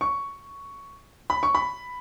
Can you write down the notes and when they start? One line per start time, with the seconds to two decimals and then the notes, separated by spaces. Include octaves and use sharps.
0.01 C#6
1.30 B5
1.43 C#6
1.55 B5